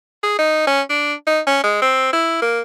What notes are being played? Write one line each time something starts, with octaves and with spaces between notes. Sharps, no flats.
G#4
D#4
C#4
D4
D#4
C#4
G#3
C4
E4
A#3